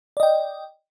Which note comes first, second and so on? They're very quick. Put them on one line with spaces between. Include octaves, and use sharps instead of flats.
D5 D#5 G5